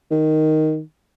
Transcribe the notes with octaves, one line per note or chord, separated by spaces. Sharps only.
D#3